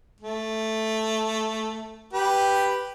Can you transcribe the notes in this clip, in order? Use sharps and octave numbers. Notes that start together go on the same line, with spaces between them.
A3
G4 B4